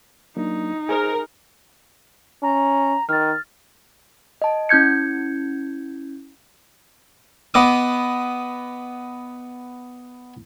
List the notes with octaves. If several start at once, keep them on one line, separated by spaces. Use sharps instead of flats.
F#3 A#3 D4 D#4
G#4 A#4 C5 G#5
C#4 A#5
D#3 F6 A6
D#5 A5
C#4 E4 G6 G#6 C#7
B3 D#5 D6 D#6